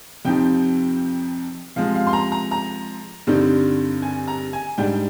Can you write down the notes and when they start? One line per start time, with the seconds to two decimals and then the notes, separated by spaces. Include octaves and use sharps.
0.25 F2 C3 F3 C4 D#4 G5
1.76 C3 F3 G#3 F5
1.95 F5
2.07 C6
2.13 A#5
2.32 A#5
2.51 A#5
3.27 G2 D3 G3 C4 D#4
4.02 G#5
4.28 A#5
4.53 G#5
4.78 G#2 G3 D4 G5